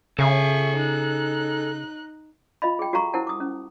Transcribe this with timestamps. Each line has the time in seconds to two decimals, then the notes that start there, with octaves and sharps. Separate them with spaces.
0.19 C#3 A4 E5 G#5 C#6
0.76 D#4 F#6
2.62 F4 D#5 F5 B5
2.79 G#4 G5
2.93 F#4 A4 F5 A#5 C#6
3.13 E4 A#4 C5 F#5 A5
3.27 D6 D#6
3.40 C#4